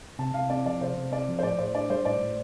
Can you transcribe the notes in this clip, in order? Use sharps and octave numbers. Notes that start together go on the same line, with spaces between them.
C3 A5
C3 F5
C4 D5
F3 D5
C3 C5
C3
C4 D5
F3
C5
A2 D5
A2 C5
D4 D5
G3 C5
A2 D5
A2